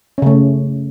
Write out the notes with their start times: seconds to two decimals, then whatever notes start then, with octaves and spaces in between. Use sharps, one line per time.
0.18 C#4
0.22 C#3
0.26 A3